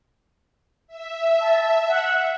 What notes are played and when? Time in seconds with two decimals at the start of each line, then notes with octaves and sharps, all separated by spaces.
0.87 E5
1.40 A5
1.88 F#5